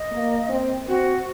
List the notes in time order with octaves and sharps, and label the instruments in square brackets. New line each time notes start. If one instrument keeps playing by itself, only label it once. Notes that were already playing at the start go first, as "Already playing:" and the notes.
Already playing: [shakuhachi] D#5
[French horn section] A#3
C4
[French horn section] C4 [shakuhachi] F#4